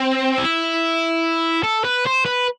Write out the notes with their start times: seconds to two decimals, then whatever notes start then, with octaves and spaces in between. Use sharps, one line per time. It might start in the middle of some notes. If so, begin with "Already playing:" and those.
Already playing: C4
0.38 E4
1.63 A4
1.84 B4
2.06 C5
2.25 B4